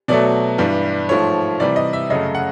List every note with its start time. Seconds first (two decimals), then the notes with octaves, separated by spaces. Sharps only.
0.08 B2 F#3 A3 D5
0.58 G2 E3 G3
1.09 G#2 F3 A3 C#5
1.60 C3 E3 G3 D5
1.76 D#5
1.93 E5
2.10 F#2 C#3 F#3 A3 D#5
2.35 F#5